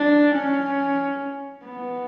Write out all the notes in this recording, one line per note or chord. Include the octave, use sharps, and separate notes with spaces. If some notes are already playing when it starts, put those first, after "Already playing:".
Already playing: D4
C#4
B3